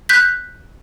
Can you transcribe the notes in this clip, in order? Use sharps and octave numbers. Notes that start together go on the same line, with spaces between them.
F#6 G6 B6